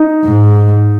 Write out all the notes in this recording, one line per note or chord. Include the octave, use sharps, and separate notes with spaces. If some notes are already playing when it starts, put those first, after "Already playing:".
Already playing: D#4
G#2